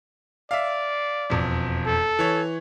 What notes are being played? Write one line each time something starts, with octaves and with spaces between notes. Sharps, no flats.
D5 E5 F5
E1 F2
A4
E3 C#5